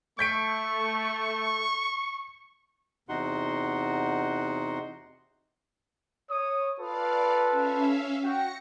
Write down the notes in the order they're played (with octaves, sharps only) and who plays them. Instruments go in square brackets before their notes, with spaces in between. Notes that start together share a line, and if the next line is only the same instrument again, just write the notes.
[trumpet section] A3 [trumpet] C#6 [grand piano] G6 B6 D7
[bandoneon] E2 C3 D#4 F#4 F#5 C6
[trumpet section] C#5 D#6
[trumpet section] F4 A4 B4 [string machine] D5 F5
[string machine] C#4 E5 F5
[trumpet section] F#4 G5 [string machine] A#6 C#7